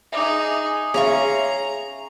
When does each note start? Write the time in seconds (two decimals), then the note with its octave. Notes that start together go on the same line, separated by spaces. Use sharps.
0.12 D#4 G#4 E5 D6
0.94 C#4 G#4 E5 F5 A#5 C#6